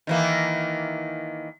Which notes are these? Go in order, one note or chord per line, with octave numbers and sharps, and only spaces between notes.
D#3 E3 A#3